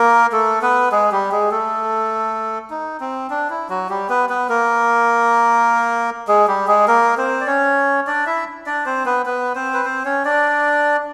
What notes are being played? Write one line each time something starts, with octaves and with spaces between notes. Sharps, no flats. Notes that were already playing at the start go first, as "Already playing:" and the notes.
Already playing: A#3 A#4
A3 A4
B3 B4
G#3 G#4
G3 G4
G#3 G#4
A3 A4
D#4
C4
D4
E4
F#3 F#4
G3 G4
B3 B4
B3 B4
A#3 A#4
G#3 G#4
G3 G4
G#3 G#4
A#3 A#4
C4 C5
D5
C#4 C#5
D4 D5
E4 E5
D4 D5
C4 C5
B3 B4
B3 B4
C4 C5
B4
C4 C5
C#4 C#5
D4 D5